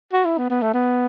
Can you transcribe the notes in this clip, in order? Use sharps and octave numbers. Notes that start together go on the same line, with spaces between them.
F#4
E4
B3
B3
A3
B3